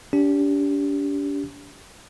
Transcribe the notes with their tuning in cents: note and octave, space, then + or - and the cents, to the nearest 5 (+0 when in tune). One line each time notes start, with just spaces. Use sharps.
D4 -40 G4 +0